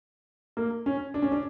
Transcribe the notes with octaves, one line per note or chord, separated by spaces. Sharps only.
A#3
C#4
D4
C#4
D4